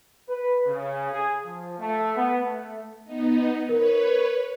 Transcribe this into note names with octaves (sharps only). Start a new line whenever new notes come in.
B4
C#3
G#4
F3
A3
B3
A3
B3 D#4
A#4 B4 C#5